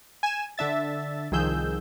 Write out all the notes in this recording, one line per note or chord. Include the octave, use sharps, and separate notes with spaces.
G#5 E7
D3 D4 E5 A6
C2 D#3 F3 G#4 E6 G6